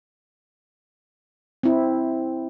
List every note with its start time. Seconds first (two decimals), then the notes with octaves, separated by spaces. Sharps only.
1.63 C4 E4